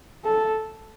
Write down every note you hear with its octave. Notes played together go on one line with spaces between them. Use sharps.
A4